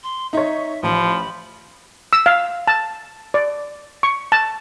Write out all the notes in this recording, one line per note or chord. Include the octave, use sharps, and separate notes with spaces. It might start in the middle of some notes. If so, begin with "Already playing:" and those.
C6
D#4 C#5 E5
A1 F3 B5
E6
F5
A5
D5
C#6
A5